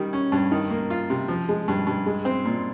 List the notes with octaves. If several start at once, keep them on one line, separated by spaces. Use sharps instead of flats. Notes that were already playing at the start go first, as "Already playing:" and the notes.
Already playing: D#3 G3
C#4
G2
D#3
A#3
F4
C3
F3
G#3
G2
G2
G#3
C4
A#2